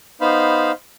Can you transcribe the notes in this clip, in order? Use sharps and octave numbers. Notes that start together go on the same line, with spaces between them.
B3 D#4 C5 F5 B5